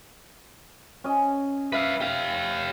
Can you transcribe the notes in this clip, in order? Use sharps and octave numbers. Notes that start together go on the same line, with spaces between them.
C#4 D#5
B4 E5 F5
G4 F5